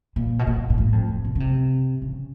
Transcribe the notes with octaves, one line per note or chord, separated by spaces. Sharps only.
A#2
B2
A#2
A#2
A2
F2
F2
B2
C#3
C3
C#3